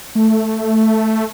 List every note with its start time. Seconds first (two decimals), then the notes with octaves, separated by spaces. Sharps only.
0.15 A3